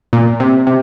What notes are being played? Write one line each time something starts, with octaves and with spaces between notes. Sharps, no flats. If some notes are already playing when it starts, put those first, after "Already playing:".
A#2
C3
C3